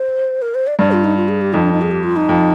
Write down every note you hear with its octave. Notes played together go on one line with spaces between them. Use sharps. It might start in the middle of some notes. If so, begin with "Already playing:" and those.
Already playing: C5
A#4
C5
D5
G2 D5
F4
D#4
F4
G#4
G4
F2 D#4
D4
D#4
G#4
G4
F4
D#4
F2